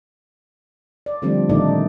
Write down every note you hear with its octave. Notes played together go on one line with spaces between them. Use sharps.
D5
D3 F3 G3 A3 C4 D4
A#2 D#3 A3 D4 D#4 D5